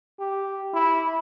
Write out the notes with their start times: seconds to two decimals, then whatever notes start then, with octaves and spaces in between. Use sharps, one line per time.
0.20 G4
0.74 E4